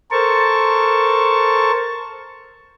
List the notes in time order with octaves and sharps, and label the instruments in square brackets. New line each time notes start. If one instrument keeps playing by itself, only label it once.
[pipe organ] A4 A#4 C5 A5 C#6